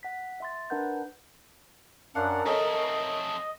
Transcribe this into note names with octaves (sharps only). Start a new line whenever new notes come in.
F#5 B6
E5 C6 A6
D4 A#4 B4 F#5 A#5 G6
F#2 D4 A#4 F5 F#5
A3 C4 G#4 A4 C#5 D#5